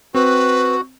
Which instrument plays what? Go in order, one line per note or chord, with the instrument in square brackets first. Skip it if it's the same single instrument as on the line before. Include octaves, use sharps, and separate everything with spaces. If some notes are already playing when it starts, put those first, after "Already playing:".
[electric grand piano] C4 [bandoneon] F#4 [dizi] B4